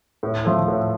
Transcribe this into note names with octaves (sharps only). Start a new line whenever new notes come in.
A2
F3 A3
A2